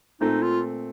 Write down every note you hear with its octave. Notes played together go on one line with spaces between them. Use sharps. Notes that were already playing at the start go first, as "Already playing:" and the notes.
A#2 A3 C4 D#4
F4